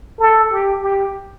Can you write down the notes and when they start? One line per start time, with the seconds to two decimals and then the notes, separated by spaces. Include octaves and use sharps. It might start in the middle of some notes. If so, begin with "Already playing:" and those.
0.20 A4
0.52 G4
0.83 G4